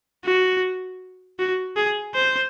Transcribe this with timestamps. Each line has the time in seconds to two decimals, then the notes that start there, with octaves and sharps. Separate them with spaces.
0.24 F#4
1.39 F#4
1.76 G#4
2.15 C5